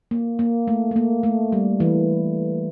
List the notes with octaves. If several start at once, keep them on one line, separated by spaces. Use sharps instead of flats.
A#3
A#3
A3
A3
A#3
A3
G3
E3